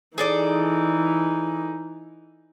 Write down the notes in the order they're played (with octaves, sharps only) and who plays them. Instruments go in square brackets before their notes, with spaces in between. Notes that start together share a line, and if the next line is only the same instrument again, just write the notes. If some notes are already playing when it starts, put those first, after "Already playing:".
[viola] E3 D#4 [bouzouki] G#4 A4 D5